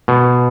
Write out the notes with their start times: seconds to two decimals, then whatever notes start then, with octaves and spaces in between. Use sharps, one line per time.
0.08 B2